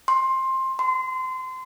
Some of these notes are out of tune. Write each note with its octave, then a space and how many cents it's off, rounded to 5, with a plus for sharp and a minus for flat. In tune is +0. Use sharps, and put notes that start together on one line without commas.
C6 +15
C6 -25